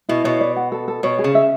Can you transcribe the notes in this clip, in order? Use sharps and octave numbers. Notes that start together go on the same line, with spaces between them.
B2 E4
B2 C#5
D5
F#5
A4
A4
B2 C#5
G#4
C#3
E5